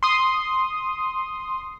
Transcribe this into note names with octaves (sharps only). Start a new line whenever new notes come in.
C6 D#6